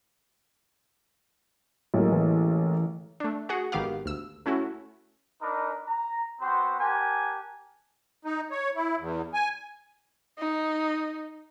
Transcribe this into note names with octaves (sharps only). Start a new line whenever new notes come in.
A1 F#3 G#3 A#3
E3
A3 D4
F#4 G#4 F#5
G#1 D#3 B3 G4 F5
D2 E6
A3 C#4 E4 F#4
D4 D#4 A#4 B4
A#5
B3 C4 F#4 C5
G4 A#4 F#5 G#5 A5
D#4
C#5
E4
E2
G#5
D#4